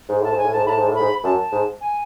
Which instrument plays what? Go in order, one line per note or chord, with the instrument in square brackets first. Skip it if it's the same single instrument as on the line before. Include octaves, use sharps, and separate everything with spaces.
[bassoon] G#2
[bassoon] A2 [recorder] A5
[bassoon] G#2
[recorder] G#5
[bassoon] A2
[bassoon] G#2 [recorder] A5
[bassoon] A2 [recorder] B5
[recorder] A5
[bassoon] G#2
A2
[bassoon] G#2 [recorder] B5
[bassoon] F#2 [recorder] A5
[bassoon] G#2
[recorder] G#5